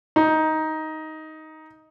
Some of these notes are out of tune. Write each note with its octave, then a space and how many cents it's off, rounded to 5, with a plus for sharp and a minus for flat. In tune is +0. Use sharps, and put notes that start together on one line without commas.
D#4 +10